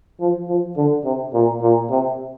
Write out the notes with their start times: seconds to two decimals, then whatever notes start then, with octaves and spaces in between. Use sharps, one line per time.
0.20 F3
0.48 F3
0.77 D3
1.04 C3
1.33 A#2
1.62 A#2
1.90 C3